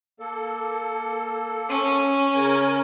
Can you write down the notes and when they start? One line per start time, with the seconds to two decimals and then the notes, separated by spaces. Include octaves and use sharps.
0.20 A#3 A4
1.70 C#4
2.35 C#3 A#4 G#5